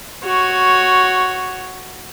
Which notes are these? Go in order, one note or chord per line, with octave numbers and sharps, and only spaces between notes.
F#4 C#5